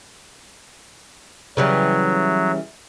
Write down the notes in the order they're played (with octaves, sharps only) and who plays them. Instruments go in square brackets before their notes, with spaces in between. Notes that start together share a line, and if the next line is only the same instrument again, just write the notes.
[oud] C#3 E3 G3 [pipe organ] F#3